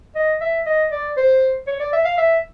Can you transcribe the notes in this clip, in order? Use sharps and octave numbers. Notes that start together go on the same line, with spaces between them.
D#5
E5
D#5
D5
C5
C#5
D5
E5
F5
E5